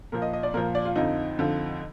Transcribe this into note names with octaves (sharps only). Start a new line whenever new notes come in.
A#2 F3 A#4
D#5
D#5
D5
A#2 F3 A#4
D5
F4
F2 D3 F3 D#4
F2 D3 F3